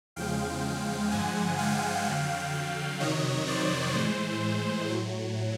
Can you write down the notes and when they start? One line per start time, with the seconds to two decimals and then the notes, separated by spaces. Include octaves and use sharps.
0.16 E2 C#3 F3 G#3 F5 G5
1.11 G2 D3 F3 G#3 F#5 G#5
1.58 F5 G5
2.06 F2 D3 F#3
2.53 F5 G5
3.00 F2 C3 D#3 F#3 C#5 D#5
3.47 C5 D5
3.95 A2 E3 G#3 C5
4.89 A2 F#3